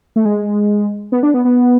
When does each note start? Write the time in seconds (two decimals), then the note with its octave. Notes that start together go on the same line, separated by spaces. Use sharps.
0.16 A3
0.25 G#3
1.12 B3
1.23 D4
1.34 B3
1.45 B3